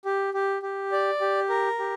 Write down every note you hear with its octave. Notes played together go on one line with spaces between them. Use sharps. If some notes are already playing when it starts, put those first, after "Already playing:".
G4
G4
G4
D5
G4
A#4
G4